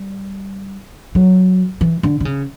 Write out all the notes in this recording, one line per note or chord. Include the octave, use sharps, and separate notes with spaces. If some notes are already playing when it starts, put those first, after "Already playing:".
Already playing: G3
F#3
E3
D3
D3
C#3